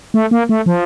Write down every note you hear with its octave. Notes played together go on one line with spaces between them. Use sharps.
A3
A#3
A3
F3